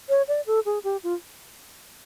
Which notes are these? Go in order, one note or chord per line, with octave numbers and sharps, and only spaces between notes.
C#5
D5
A4
G#4
G4
F4